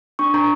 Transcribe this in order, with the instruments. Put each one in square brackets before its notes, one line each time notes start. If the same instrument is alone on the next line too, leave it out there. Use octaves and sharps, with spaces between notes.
[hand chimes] D4 C#6
D4 A#5